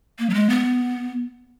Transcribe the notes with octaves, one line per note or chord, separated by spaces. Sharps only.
A#3
F#3
G#3
B3